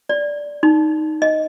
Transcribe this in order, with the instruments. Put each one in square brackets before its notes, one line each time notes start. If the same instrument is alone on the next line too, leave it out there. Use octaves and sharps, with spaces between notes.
[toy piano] D5
D#4
D#5